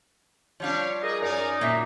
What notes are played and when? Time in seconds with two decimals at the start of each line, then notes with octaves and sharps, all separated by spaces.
0.60 F3 G3 D4 C#5 F5
1.03 G#4 A#4 D5 D#5
1.20 F#2 D#4 A#4 D5 G#5
1.61 A#2 A#3 E5